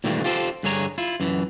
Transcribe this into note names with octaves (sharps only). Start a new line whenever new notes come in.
A#2 D#3 E3 G3 A3 A#3
F4 G4 A4 C5
G2 D3 G#4 C#5 A#5
E4 F4
F#2 E3